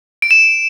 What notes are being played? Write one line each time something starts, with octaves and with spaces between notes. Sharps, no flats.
D7
E7